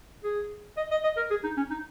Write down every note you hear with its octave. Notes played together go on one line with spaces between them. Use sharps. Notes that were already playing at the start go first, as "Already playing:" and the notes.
G#4
D#5
D#5
D#5
A#4
G#4
D#4
C#4
D#4